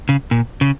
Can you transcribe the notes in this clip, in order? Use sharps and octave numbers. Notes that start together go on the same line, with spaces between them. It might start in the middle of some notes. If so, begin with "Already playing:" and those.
C#3
A#2
C#3